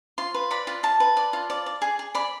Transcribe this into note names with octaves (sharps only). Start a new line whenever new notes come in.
F4 C6
B4
D5 B5
F4
F4 A5
B4
D5
F4
D5
D5
G#4
G#4
D5 B5